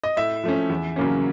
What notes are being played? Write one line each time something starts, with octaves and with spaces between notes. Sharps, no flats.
D#5
A2 E5
F3 A3 C#4
E2
C#3 F#3 A#3 C#4